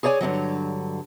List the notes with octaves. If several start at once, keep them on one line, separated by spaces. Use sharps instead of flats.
G#4 C#5 D5 G5 G#5
G2 D3 D#3 F#3